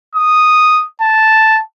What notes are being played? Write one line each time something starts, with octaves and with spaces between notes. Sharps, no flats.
D#6
A5